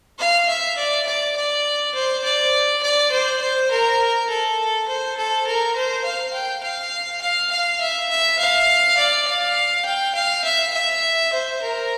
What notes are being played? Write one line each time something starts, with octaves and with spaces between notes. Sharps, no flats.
F5
E5
D5
D5
D5
C5
D5
D5
C5
C5
A#4
A4
C5
A4
A#4
C5
F5
G5
F5
F5
F5
E5
E5
F5
D5
F5
G5
F5
E5
E5
C5
A#4